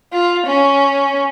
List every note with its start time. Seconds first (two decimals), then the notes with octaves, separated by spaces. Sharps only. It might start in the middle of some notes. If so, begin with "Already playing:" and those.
0.13 F4
0.46 C#4